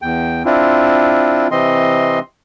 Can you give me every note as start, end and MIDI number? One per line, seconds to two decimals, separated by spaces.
0.02 0.43 40
0.02 0.43 79
0.45 1.48 60
0.45 1.48 62
0.45 1.48 64
0.45 1.48 65
1.51 2.19 48
1.51 2.19 52
1.51 2.19 60
1.51 2.19 75
1.51 2.19 84